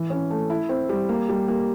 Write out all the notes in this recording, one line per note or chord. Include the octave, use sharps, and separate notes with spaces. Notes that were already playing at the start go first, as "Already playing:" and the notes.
Already playing: E3
C#4
A3
E4
C4
G3
A#3
G3
A#3